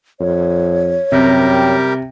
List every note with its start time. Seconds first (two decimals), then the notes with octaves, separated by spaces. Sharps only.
0.20 F2 C#5
1.12 F#2 C3 G3 G4 A#4